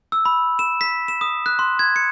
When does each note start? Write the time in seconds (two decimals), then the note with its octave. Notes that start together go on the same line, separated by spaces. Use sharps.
0.12 E6
0.25 B5
0.59 E7
0.81 B6
1.08 E7
1.21 D#6
1.46 F#6
1.59 C6
1.79 G#6
1.96 C#7